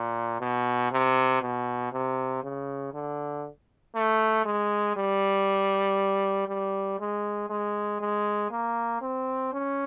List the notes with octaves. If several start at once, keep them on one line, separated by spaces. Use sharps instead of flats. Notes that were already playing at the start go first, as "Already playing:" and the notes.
Already playing: A#2
B2
C3
B2
C3
C#3
D3
A3
G#3
G3
G3
G#3
G#3
G#3
A#3
C4
C#4